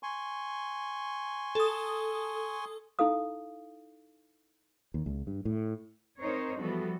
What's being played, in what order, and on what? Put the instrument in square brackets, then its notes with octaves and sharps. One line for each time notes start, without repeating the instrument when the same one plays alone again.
[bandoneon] G#5 C6 C#6
[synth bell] A4 D#6
[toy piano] D#4 E4 A4 F5 D#6
[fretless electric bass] D#2
C#2
G2
A2
[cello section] C4 D#4 A#4 C5 C#5
E3 F3 G3 B3 F#4 A4